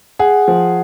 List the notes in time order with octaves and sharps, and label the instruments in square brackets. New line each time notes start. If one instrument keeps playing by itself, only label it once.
[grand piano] G#4 [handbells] F#5
[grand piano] F3